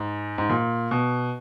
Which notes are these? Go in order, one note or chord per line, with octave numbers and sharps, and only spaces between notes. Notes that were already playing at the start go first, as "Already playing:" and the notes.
Already playing: G#2
G#2
A#2
B2